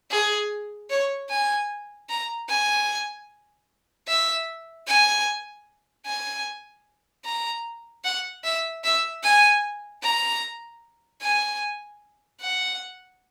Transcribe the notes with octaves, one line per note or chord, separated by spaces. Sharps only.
G#4
C#5
G#5
A#5
G#5
E5
G#5
G#5
A#5
F#5
E5
E5
G#5
A#5
G#5
F#5